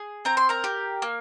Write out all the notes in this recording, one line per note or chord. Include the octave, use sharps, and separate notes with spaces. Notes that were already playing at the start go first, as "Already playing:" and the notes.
Already playing: G#4
C4 A#5
C6
A#4 A#5
G4
A#3